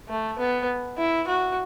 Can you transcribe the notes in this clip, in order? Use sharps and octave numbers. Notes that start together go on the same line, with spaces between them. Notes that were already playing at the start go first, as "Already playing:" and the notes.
A3
B3
E4
F#4